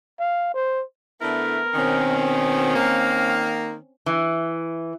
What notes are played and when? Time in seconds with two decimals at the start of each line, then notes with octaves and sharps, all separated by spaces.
0.19 F5
0.54 C5
1.21 D3 A3 B3 E4 A#4
1.74 B2 D#3 C4 C#4
2.76 D#3 A#3 F5
4.06 E3